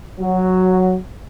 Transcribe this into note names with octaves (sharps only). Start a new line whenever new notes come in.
F#3